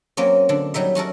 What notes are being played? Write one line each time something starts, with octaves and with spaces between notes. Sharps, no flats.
F#3 A#3 C4 C#4
D3 D4
F#3 G3 D#4 E5
C#4 F#4 A4 A#4